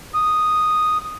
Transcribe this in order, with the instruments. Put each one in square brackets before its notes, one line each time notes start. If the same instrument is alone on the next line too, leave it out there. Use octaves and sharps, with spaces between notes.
[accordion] D#6